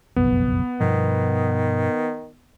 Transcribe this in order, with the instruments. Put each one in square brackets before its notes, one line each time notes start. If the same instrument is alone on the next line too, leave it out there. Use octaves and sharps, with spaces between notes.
[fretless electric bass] F#1 B1 F2 [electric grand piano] B3
[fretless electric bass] G2 B2 F3 [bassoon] D#3